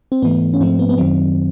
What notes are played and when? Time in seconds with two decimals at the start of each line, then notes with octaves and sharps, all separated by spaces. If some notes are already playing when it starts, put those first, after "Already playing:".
0.12 C4
0.22 G#2 E3 A3 B3
0.54 C#4
0.61 G#2 F3 A3 C4
0.79 B3
0.89 B3
0.98 F#2 D#3 F#3 C4